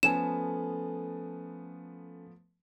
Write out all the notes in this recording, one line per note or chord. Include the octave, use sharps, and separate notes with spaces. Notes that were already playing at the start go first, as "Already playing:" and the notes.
F3 A3 B3 C#4 A4 G#5 E7